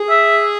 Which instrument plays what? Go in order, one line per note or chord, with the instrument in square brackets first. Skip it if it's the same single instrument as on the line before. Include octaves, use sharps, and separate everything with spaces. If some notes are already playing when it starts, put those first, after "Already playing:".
Already playing: [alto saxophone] G#4
[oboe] E5